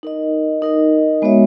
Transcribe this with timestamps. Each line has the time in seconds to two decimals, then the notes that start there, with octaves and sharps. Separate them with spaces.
0.03 D#4 A#4 D#5
0.62 D#4 A#4 D#5
1.22 G#3 B3 F#4 C#5 E5